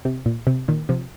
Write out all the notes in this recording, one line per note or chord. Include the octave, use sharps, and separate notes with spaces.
C3
A#2
C3
A#2 D#3
C3 F3